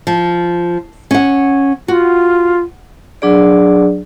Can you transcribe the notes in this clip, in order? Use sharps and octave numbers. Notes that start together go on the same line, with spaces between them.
F3
C#4 F#5
F4 F#4
F#3 D4 G#4 D5